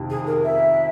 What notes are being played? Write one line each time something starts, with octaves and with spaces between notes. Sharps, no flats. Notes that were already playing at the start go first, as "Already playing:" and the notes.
Already playing: F2 C3 D#3
G#4
A#4
E5